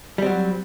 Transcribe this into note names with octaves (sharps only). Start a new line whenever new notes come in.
F#3 G3 C4